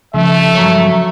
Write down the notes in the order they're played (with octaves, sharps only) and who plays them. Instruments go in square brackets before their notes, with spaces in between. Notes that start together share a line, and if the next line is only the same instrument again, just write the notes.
[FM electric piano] C#3 F3 [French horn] A3 [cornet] E5
[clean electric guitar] G2 F#3 C#5